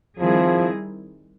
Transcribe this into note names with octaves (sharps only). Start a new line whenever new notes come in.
D#3 F3 G3 C4 E4 G#4